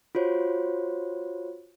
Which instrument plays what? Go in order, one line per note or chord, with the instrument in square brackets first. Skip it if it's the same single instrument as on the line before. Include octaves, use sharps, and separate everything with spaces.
[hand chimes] F4 F#4 C5 C#5